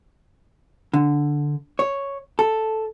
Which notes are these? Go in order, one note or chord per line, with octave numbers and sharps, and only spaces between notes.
D3
C#5
A4